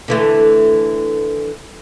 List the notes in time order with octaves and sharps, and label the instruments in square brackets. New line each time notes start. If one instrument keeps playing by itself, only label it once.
[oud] D3 E3 A3